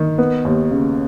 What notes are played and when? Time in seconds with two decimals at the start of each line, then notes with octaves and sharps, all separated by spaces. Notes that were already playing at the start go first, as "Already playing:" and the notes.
Already playing: D#3
0.18 B3
0.45 D#2
0.71 C#3